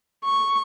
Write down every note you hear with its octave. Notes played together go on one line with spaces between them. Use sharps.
C#6